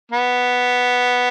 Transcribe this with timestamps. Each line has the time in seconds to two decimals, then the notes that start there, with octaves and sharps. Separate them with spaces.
0.12 B3